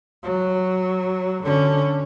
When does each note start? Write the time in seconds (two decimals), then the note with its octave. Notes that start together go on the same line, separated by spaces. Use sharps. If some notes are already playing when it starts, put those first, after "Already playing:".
0.23 F#3
1.43 D3 C#4